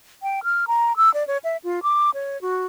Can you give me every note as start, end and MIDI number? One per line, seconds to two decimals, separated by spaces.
0.22 0.43 79
0.43 0.65 89
0.67 0.96 82
0.96 1.12 88
1.14 1.26 74
1.27 1.38 73
1.44 1.57 76
1.64 1.80 65
1.83 2.10 86
2.14 2.40 73
2.42 2.67 66